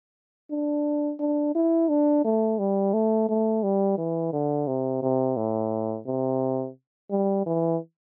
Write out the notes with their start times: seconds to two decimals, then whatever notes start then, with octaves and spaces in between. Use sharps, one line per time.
0.51 D4
1.20 D4
1.55 E4
1.89 D4
2.25 A3
2.59 G3
2.94 A3
3.29 A3
3.63 G3
3.98 E3
4.33 D3
4.67 C3
5.02 C3
5.37 A2
6.07 C3
7.11 G3
7.46 E3